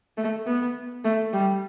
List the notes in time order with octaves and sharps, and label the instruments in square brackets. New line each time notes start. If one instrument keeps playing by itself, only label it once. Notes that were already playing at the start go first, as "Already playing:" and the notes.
[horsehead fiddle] A3
B3
A3
G3